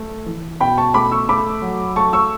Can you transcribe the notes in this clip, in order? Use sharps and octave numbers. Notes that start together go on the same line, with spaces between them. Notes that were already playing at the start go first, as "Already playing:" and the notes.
Already playing: A3
E3
B2 G5 B5
A5 C#6
A3 B5 D6
C#6 E6
A3 B5 D6
F#3
A3 A5 C#6
C#6 E6